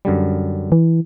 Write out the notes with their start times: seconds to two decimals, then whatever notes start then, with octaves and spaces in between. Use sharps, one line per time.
0.05 F#2 D3 G3
0.72 E3